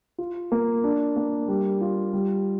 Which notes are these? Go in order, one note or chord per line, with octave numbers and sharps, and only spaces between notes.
F4
A#3
D4
A#3
G3
F4
G3